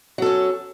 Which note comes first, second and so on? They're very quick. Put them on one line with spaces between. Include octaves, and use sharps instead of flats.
F#3 A4 C#4